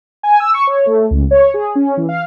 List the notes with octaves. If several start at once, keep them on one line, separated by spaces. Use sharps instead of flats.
G#5
E6
C#6
C#5
A3
C#2
C#5
G#4
C#4
E3
F5